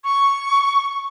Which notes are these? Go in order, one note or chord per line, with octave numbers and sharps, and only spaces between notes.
C#6